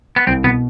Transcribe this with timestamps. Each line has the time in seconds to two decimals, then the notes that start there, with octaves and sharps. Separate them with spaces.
0.16 B3
0.27 C2 C4
0.44 B2 B3